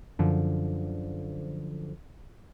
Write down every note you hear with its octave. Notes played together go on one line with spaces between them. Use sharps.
F#2 D3 F3